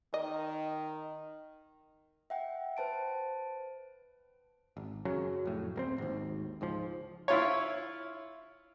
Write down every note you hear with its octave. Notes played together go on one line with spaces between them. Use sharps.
D#3 D#5
E5 F#5 G5
B4 C5 A5 D7
G#1
F#2 C#3 F#3
F1 A2
D1 A#3 C4
G#1 D#2
C#2 G#2 F3
E4 F4 C#5